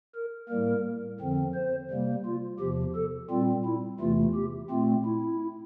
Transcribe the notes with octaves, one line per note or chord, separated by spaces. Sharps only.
A#4
A2 G3 A#3 A#4
F2 D3 F3 C4
C5
C3 G3 A#3
F4
E2 C3 F3 G4
A4
A#2 G3 C4 F4
E4
E2 C3 E3 A3 F4
G4
A#2 A3 C4 F4
E4